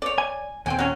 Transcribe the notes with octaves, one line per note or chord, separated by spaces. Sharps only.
C#5 D5
G#5
D#2 A#2 C4 G5 G#5
F#3 C#4